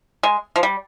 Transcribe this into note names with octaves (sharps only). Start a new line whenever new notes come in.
G#3
F3
G3